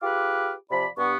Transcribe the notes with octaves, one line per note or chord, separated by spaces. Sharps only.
F4 G4 G#4 B4 D6 F6
C3 F3 D5 B5
G2 B3 C#6